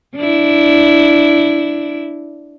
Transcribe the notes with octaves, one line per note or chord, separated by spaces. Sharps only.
D4 E4